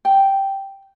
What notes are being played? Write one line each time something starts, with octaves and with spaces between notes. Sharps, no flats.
G5